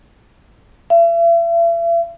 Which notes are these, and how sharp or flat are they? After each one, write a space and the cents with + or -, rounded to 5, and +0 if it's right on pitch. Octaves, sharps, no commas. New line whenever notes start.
E5 +40